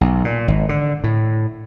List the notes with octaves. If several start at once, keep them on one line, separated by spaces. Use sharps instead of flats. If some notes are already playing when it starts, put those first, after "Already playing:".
B1
A#2
G#1
D3
A2